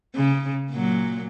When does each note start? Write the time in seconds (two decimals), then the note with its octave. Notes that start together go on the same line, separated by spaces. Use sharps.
0.15 C#3
0.71 A#2 F#3